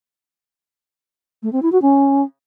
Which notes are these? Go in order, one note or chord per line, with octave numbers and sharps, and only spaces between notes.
A3
C4
E4
F#4
C#4